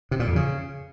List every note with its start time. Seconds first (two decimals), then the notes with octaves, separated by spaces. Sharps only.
0.11 C3
0.20 A#2
0.28 F2
0.36 C#3